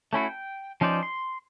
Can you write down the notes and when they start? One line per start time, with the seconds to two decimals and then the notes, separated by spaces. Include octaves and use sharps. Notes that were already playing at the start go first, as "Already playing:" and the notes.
0.13 A3 C#4 E4 F#4
0.29 G5
0.81 F3 C#4 D#4 C5 D5
1.03 C6